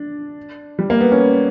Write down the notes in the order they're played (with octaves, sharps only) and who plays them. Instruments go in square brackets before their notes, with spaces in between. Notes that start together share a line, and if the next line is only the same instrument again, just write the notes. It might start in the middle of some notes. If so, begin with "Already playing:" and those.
Already playing: [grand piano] D4
G3
A#3
B3
C#4